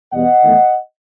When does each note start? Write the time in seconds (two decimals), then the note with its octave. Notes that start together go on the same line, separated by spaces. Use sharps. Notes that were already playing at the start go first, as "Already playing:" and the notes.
0.12 E2 B2 G3 B3 D#5 F#5
0.42 E2 D#3 A3